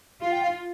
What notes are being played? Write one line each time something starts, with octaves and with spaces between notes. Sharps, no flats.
F4 F5
G5
F5